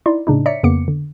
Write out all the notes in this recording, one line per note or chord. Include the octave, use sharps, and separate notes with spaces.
D#4 E4 D5 C6
A2 C#3 D4 D#4
C#5 D5 E5 A#5 B6 C#7
F2 C#3 A#3 B3 D6 C#7
D3